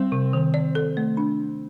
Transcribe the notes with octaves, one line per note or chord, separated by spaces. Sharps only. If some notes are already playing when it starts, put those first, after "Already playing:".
Already playing: G3 C4
C3
D#3
D5
A4
A3
D4